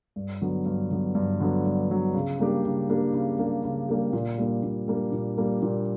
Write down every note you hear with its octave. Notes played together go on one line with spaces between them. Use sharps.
G2
D3 F#3 B3
G2
D3 F#3 B3
G2
D3 F#3 B3
G2
D3 F#3 B3
C#3
G3 A#3 D4 G4
C#3
G3 A#3 D4 G4
C#3
G3 A#3 D4 G4
C#3
G3 A#3 D4 G4
A#2
G3 A#3 D4
A#2
G3 A#3 D4
A#2
G3 A#3 D4
A#2